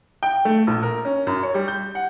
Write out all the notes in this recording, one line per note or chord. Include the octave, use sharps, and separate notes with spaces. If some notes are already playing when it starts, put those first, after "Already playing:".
G5
A3
A#1
A#4
C#4
F#2
C#5
G3
G6
F#5